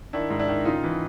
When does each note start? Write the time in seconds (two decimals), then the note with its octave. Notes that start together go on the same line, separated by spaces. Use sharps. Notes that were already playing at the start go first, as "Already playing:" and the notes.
0.13 D#3 D4 E4
0.30 G#2
0.39 D4 E4
0.48 D#3
0.65 C#3 D#4 F4
0.83 E3